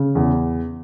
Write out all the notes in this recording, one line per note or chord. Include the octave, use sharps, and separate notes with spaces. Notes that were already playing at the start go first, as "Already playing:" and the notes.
Already playing: C#3
E2